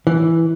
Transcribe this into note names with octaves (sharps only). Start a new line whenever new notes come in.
E3